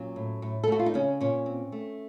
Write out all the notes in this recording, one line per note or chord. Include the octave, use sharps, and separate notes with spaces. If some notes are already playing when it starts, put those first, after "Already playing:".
Already playing: A#2 F#3 C#4
A2
A2
A4
A3 F#4
F4
D#4
C#3 C#4
A#2 C#4
C4
A3